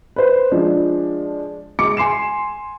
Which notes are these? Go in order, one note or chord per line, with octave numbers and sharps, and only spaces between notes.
B4 C5
F3 G#3 D4
G#3 D6 C#7
G#5 C6 C7 E7